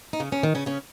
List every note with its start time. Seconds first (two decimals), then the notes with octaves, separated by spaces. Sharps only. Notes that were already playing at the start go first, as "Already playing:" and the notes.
0.13 D#4
0.20 C#3 C#4
0.32 C#3 C#4
0.43 D#3
0.55 C#3 C#4
0.66 C#3 C#4